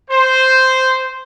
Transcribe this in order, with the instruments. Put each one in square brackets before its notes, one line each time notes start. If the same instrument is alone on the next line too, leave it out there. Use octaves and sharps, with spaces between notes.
[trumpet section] C5